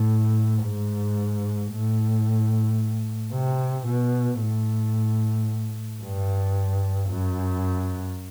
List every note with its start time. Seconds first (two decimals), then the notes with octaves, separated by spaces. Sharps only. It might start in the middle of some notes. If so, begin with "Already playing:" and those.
Already playing: A2
0.64 G#2
1.72 A2
3.33 C3
3.87 B2
4.40 A2
6.02 G2
7.09 F#2